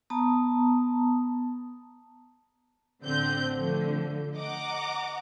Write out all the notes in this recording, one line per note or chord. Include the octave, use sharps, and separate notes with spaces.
B3 A5 A#5 D#6
A1 D3 C4 G6
D3 F3 A3
D#5 F#5 A#5 D6